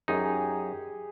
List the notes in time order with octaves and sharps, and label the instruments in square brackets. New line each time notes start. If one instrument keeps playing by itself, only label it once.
[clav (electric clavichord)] F#2 D#4 [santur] G4 G#4